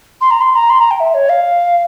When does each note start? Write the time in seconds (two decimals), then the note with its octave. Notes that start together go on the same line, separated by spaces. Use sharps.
0.21 C6
0.30 A#5
0.40 C6
0.55 A#5
0.69 C6
0.80 A#5
0.90 G5
1.00 E5
1.14 C#5
1.29 F5